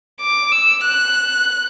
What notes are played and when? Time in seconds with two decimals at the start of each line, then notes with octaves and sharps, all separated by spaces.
0.21 D6
0.52 E6
0.83 F#6